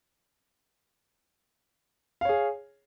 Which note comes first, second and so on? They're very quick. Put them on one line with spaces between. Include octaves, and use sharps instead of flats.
F5 C#5 G#4